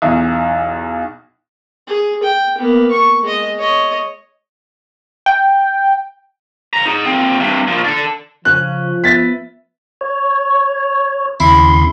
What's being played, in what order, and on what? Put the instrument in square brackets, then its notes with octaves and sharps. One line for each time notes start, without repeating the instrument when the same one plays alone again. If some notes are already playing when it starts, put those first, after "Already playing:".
[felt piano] B1 E2
[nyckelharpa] G#4
G5
A#3 B3
C#6
G#3 D#5
C#5 D#5
[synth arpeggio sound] G5
[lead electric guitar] C#3 A#5
D#4 G#4
A#2 C4
G2 C3
A#2 F3
D4 A4
[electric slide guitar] C#3 C#4 [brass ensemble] F3 [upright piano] F#6
[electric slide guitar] B3 [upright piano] E5 A6 B6
[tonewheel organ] C#5
[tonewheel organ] D#2 C#3 C6 [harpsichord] E4